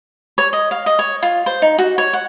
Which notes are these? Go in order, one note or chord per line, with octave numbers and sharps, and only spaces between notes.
C#5
D#5
F5
D#5
C#5
F4
C5
D#4
F#4
C#5
F#5